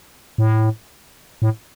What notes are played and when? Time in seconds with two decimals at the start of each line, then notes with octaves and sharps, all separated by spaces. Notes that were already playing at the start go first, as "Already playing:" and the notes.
0.38 A2
1.42 A2